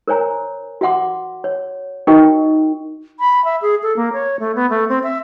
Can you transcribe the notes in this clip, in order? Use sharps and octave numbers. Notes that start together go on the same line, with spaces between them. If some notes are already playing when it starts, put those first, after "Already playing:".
A#4 C5 C#5 G#5 A#5
F#4 E5 F#5 C6 D6
C#5
D#4 F#4 A#4 D#5 G5 C#6
B5
E5
G#4
A4
A#3
C#5
A3
B3
A3
C4
E5